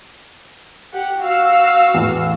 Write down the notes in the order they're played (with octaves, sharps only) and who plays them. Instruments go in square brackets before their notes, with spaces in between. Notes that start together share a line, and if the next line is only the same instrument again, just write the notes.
[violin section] G4 F#5
F#4 F5 E6
[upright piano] E2 A2